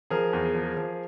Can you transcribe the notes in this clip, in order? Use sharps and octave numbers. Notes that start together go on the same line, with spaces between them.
F3 G#4 A#4
E2
F3
F3